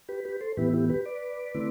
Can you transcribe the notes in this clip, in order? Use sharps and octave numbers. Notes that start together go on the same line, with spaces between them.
G4 B4
G4 B4
A4 C5
A2 E3 B3 E4 G4 B4
E4 G4
G4 B4
B4 D5
D3 A3 C4 E4